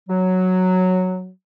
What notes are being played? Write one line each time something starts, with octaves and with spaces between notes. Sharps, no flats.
F#3